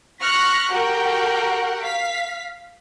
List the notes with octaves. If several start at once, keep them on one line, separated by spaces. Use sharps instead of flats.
C#6 F6 F#6 A#6 B6 C#7
F#4 G4 A#4 F#5 G5
F5 B6